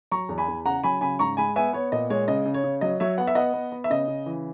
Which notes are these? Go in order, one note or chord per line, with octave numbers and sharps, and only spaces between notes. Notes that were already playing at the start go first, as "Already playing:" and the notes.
F#3 A#5 C#6
E2
G#5 B5
E2
C#3 F#5 A#5
F#3 G#5 B5
C#3 G#5 B5
G#2 A#5 C#6
G#3 G#5 B5
B3 E5 G#5
B3 C#5
A#2 D#5
G#3 C#5
C#3 D#5
C#3
C#5
C#3
F#3 D#5
F#3 C#5 E5
B3 F#5
E5
B3 D#5 F#5
B3
B3
E5
C#3 D#5
C#3
E3